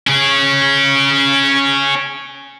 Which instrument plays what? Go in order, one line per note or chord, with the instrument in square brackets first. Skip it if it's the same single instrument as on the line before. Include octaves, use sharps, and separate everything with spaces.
[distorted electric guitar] C#4 G#4